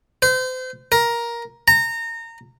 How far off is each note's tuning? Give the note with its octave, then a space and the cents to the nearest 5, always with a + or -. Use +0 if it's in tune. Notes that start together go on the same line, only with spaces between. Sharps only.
C5 -35
A#4 +10
A#5 -25